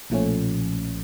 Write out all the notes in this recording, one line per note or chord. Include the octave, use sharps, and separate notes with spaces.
B1 A#2 F3 A3 C#4